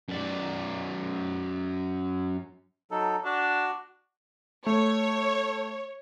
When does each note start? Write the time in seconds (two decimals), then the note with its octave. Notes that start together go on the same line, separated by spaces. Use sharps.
0.08 F#2 D5
2.91 F#3 D#4 A4
3.25 D4 F#4
4.67 A3 C#5